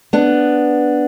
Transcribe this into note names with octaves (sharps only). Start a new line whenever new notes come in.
B3 D4